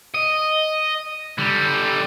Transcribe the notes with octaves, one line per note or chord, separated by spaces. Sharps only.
D#5
D3 G3